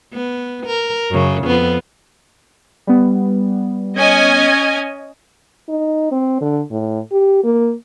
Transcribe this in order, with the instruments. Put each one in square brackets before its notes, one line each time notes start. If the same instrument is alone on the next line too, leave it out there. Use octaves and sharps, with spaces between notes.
[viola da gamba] B3
A#4
F#2 C#3
F2 B3 F4
[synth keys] G3 B3
[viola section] C#4 D#5 G#5
[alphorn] D#4
C4
D3
A2
G4
A#3